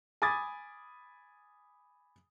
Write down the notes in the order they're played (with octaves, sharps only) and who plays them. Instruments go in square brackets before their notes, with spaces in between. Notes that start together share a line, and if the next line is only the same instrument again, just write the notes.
[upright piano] G#5 B5 D6 D#6 G#6 A6